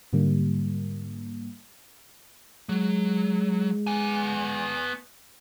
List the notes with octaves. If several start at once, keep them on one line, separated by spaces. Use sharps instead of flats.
G#2 D3 G3 A#3
F#3 G#3
B3 G#5